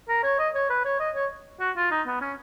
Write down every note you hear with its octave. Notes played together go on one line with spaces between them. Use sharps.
A#4
C#5
D#5
C#5
B4
C#5
D#5
C#5
F#4
F4
D#4
B3
C#4